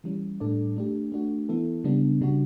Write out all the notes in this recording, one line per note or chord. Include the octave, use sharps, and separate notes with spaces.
E3 G3 C#4
A2 G3 D4 A4 D5
A3 D4 G4
A3 D4 F#4
E3 B3 E4 A4
C#3 G3 B3 D4
C#3 G3 D4 F#4